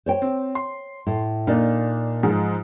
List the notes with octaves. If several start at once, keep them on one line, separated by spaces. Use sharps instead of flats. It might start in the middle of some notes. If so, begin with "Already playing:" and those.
C5 C#5 G5
C4
C6
A2
A#2 D4 D#4 F5
G#2 F3 G#3